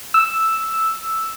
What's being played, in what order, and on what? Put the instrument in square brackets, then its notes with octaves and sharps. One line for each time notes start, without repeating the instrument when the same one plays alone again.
[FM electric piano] E6